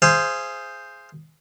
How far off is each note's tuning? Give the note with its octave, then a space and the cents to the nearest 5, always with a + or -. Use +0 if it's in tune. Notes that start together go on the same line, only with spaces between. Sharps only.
G#4 +0 C5 +0 F5 -40